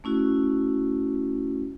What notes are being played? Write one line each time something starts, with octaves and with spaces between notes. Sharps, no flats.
A3 C#4 E4 F#4